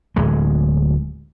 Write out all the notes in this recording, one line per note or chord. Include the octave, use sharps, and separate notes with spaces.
D1 G#3